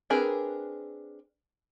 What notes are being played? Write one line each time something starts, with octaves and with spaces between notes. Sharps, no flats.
C4 D4 G#4 A#4 B4